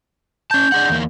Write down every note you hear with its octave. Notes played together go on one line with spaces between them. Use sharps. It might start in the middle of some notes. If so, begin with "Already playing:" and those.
C#4 A5 G6
D4 G#4 F#5
E2 A#3